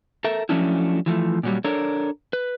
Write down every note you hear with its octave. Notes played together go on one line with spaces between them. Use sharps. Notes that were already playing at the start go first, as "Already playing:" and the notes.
A4 A#4 E5
F3 F#3 A3 C#4 D4 E4
E3 F3 A3
A#2 F#3 G3
D4 A4 A#4 C#5 D5
B4